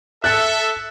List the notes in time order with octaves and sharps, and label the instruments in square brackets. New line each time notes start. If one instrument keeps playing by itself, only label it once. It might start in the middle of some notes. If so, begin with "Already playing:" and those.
[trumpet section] A4 E5 [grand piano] F#6 A6 C#7